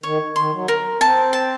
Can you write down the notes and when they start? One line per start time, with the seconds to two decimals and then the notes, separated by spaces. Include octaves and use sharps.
0.03 D#3 C#5
0.36 D#3 C6
0.52 F#3
0.68 A#4
1.01 C4 A5
1.33 A5